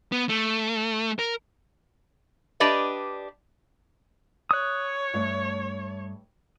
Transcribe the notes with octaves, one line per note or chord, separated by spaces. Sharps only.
B3
A3
A#4
D4 G4 B4 D5 D#5
C#5 D#6 F#6
G2 A3 F5